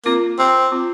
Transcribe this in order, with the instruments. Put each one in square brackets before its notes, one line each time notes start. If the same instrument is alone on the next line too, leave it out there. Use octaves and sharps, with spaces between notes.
[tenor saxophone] A#3 [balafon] C4 F4
[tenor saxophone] C4
[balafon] C4 F4